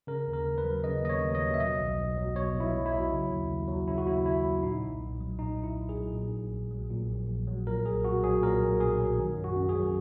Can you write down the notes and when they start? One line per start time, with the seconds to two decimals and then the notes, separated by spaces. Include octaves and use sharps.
0.07 C#3 A#4
0.27 D#2
0.33 A#4
0.46 D#2
0.58 B4
0.64 F#3
0.84 C#3 D#5
1.03 D#2 D#5
1.09 C#5
1.22 D#2
1.35 D#5
1.41 F#3
1.54 E5
1.59 B2 D#5
1.78 B1
1.97 B1
2.17 F#3
2.35 B2 C#5
2.54 B1
2.60 E4
2.73 B1
2.86 E4
2.92 F#3
3.11 C#3
3.30 D#2
3.50 D#2
3.68 F#3
3.88 C#3 E4
3.98 F#4
4.06 D#2 E4
4.25 D#2 E4
4.45 F#3
4.63 A#2 D#4
4.82 B1
5.01 B1
5.20 F#3
5.39 A#2 D#4
5.58 B1
5.64 E4
5.77 B1
5.89 G#4
5.96 F#3
6.14 A#2
6.34 A#1
6.52 A#1
6.71 F#3
6.91 A#2
7.10 A#1
7.28 A#1
7.47 F#3
7.67 A#2 A#4
7.85 B1 G#4
8.05 B1 F#4
8.23 F#3 G#4
8.42 A#2 A#4
8.61 B1
8.80 B1 G#4
8.99 F#3
9.18 D#3
9.37 F#2
9.44 F#4
9.56 F#2
9.69 G#4
9.76 F#3